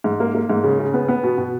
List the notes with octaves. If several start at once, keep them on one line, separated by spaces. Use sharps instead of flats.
G#2
A#3
A#3
G#2
C#3
C#3
B3
B3
B2
B2